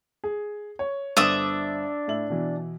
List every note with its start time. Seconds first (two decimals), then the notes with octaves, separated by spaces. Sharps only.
0.24 G#4
0.79 C#5
1.17 G1 D4 C5 E5 D6 D#6
2.08 A2 E4 F#7
2.30 B2 E3